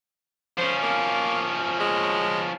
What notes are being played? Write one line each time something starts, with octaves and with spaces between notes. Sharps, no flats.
F3 C#4 C5
A#3
G#3